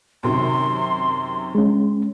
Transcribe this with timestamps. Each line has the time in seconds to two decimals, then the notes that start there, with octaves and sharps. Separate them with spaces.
0.23 F#2 C3 D#3 C6
1.55 G#3 C#4